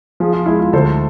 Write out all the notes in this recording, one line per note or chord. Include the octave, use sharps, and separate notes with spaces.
F3 G#4
F4
G#3 E4
F4
D2 A4 C5